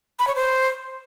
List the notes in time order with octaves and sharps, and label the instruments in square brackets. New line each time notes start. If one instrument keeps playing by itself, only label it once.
[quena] B5
C#5
C5